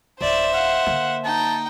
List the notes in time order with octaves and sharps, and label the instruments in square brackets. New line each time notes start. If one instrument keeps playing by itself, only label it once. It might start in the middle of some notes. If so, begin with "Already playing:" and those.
[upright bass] D1 [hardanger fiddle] C5 E5 [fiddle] D5
[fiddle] F5 [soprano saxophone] F#5
[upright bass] D3 A#3
[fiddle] D#4 G5 [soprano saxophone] A5